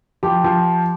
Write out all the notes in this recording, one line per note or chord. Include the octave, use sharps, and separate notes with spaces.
F3 G4
F3